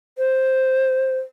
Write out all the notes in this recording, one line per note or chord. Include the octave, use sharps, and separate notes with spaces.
C5